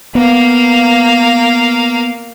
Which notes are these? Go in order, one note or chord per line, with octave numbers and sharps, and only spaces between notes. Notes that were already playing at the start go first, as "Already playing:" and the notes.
A#3 B3 F5